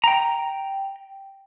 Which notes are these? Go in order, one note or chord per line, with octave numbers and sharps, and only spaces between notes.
G5 A#5